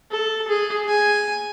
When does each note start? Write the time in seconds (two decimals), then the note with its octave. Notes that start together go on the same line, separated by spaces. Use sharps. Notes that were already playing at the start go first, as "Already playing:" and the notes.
0.11 A4
0.48 G#4
0.88 G#5